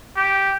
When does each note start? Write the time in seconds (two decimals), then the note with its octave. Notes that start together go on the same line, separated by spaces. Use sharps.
0.16 G4